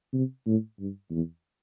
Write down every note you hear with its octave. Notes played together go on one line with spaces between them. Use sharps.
C3
A2
G2
E2